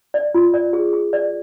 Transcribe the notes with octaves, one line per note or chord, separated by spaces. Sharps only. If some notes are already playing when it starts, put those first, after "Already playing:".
D5
F4
D5
G#4
G#4
D5